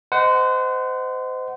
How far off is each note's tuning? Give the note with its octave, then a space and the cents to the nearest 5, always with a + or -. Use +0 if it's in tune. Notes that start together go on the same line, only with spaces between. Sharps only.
C5 -30 D#5 +0 F#5 +10